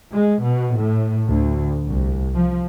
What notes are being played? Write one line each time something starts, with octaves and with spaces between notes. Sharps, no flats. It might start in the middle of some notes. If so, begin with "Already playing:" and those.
G#3
B2
A2
D2
C2
F3